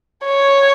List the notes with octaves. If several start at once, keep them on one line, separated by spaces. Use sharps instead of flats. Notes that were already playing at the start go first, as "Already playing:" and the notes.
C#5